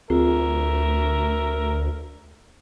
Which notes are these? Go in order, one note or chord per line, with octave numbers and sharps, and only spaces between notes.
D2 C4 F4 G#4 A#4 E5